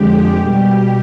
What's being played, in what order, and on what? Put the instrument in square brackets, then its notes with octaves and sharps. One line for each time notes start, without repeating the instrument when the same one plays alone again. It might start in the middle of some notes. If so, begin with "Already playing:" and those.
Already playing: [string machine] F2 D3 G#3 G4
B2 G3 G4